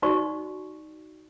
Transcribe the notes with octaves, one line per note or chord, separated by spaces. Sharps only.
D#4 F#4 D5 C#6